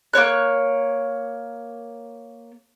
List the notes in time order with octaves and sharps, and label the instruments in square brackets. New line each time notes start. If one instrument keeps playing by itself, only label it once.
[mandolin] A#3 C#4 C#5 F#6